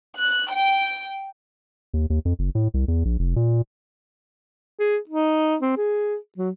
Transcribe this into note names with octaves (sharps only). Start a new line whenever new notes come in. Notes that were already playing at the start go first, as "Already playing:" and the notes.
F#6
G5
D#2
D#2
F2
F#1
A2
C2
E2
A#1
F1
A#2
G#4
D#4
C4
G#4
F#3